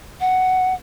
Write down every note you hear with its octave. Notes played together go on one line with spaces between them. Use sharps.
F#5